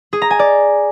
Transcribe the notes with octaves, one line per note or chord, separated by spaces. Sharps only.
G#4
A#5
G#5
D5